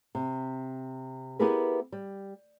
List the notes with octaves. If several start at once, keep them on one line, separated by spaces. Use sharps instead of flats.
C3
B3 E4 G4 G#4 A#4 B4
G3